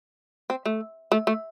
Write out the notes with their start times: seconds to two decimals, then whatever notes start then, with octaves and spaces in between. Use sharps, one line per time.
0.50 C4
0.66 A3
1.12 A3
1.27 A3